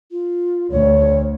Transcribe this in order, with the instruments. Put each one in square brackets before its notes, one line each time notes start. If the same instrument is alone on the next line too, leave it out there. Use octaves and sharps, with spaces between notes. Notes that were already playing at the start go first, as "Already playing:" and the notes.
[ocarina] F4
[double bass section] D2 [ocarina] C#5